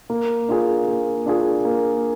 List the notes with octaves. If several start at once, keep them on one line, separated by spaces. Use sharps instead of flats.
A#3
D4 F4 G#4
A#3
D4 F4 G#4
A#3